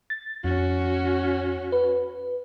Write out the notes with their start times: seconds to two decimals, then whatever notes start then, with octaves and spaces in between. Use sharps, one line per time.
0.10 A6
0.44 F2 C#4 F#4
1.72 B4